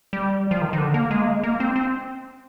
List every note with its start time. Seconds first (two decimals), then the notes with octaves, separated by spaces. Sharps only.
0.13 G3
0.51 F3
0.62 D#3
0.73 D#3
0.78 D3
0.94 A#3
1.11 G#3
1.21 A#3
1.28 G#3
1.43 A#3
1.60 C4
1.76 C4